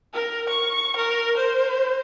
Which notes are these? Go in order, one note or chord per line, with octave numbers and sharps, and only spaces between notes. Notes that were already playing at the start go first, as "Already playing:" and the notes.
A#4
C#6
A#4
C5